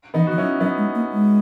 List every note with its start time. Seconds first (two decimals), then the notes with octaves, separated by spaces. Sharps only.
0.14 E3 B3 D#4
0.27 E3 F#4
0.37 F#3 C#4 E4
0.60 F#3 B3 D#4
0.78 G#3
0.95 A#3
1.12 G#3